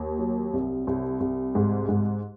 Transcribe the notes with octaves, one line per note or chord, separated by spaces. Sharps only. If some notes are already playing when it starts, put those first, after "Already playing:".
Already playing: D#2
F#3
C2
C2
C2
G#2
G#2